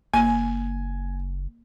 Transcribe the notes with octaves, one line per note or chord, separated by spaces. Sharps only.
F#1 A#3 G#5